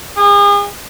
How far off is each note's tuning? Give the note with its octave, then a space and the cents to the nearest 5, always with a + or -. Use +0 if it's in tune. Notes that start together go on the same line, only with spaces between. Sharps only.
G#4 -40